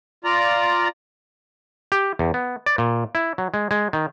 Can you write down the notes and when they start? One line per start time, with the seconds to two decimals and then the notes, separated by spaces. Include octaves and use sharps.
0.24 F4 D5 A#5
1.92 G4
2.19 E2
2.34 B3
2.66 D5
2.78 A#2
3.15 E4
3.38 F#3
3.54 G#3
3.71 G#3
3.93 D#3